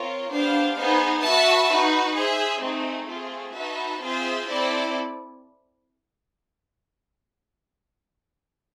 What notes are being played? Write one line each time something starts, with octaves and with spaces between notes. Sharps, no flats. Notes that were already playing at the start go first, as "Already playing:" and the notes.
Already playing: C4 F4 A#4 C#5
B3 D4 G4 C5 F5
B3 D#4 G#4 C5
F#4 B4 E5 A5
D#4 F#4 B4
G#4 C5 E5
A3 C4 D#4 G#4
A3 C4 F4 G#4
D#4 F#4 B4 E5 A5
C4 F4 G#4 C5 E5
C4 E4 A4 D5